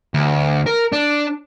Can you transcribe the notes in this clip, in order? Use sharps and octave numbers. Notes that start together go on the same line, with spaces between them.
D2
A#4
D4